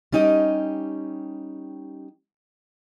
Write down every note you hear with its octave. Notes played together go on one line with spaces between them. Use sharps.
G3 C#4 D#4 G4 D#5